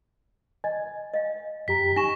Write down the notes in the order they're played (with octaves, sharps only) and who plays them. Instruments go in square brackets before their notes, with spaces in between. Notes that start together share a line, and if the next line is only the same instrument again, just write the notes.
[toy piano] D#5 [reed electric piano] G#5
[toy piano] D#5 F5
[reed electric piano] F#2 G4 A#5 [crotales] B6
[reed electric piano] D#4 [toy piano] G#5 C#6 [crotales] A#6 E7